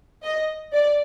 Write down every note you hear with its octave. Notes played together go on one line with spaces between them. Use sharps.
D#5
D5